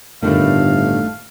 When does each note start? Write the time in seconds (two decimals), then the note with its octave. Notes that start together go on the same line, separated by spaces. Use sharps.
0.22 G1 A2 D3 D#3 A3 F5